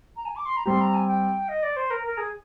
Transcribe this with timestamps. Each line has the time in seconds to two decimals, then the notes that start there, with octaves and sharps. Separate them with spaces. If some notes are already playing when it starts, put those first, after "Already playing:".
0.16 A#5
0.25 G#5
0.36 D6
0.45 C6
0.56 A#5
0.66 G3 C4 G4 C6
0.81 A#5
0.94 G#5
1.07 G5
1.48 D#5
1.63 D5
1.76 C5
1.90 A#4
2.04 A#4
2.17 G#4